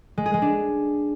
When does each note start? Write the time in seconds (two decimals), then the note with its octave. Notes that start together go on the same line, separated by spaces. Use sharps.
0.18 G#3
0.26 G#4
0.34 G#3
0.42 D4